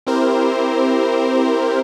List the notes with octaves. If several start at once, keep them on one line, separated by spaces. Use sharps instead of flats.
C4 E4 G4 A#4 C5